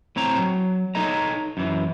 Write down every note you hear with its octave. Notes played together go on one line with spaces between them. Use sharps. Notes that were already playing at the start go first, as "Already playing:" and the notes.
A2 C4 C#5 A#5
F#3
D#4 A4 C#5 D#5 A#5
F#2 E3